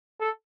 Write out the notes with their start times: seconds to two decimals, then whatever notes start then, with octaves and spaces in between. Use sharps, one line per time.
0.20 A4